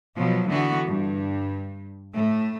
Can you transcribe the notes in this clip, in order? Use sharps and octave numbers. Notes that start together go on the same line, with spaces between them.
B2 F3 F#3
D3 E3 B3 F#4
G2
A2 A3